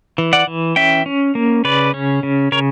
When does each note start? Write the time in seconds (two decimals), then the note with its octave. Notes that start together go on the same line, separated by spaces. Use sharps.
0.18 E3
0.33 D5 F#5
0.47 E3
0.76 C#4 E5 G5
1.06 C#4
1.35 A#3
1.64 C#3 B4 D5
1.94 C#4
2.23 C#3
2.52 C#3 A#4 C#5